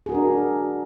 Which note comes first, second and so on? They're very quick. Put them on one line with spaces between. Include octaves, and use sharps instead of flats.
G#4 F#4 A#4 D4